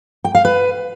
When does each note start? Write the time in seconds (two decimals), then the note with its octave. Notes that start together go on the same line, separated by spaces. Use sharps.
0.25 G5
0.35 F5
0.45 B4